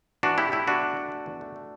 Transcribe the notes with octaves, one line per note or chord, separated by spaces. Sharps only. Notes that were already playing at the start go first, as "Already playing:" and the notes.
E3 D4 F#4
C#3 E4 G4
A3 E4 G4
E2 D4 F#4
A3
A3
A3
E2
A3
A3